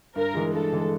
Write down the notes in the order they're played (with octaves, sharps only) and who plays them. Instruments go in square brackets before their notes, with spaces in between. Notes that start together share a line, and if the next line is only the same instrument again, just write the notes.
[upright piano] G2 [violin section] A#4
[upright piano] E3 G#3
[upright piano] G2 [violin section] A4
[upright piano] E3 G#3